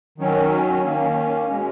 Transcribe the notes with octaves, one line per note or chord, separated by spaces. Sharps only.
D#3 F#3 C#4
D#3 A#3 C#4
B2 G#3 C#4